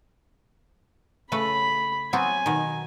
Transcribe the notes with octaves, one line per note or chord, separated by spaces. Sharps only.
C#3 A3 B4 B5
F#3 B3 C4 G#5
B2 D#3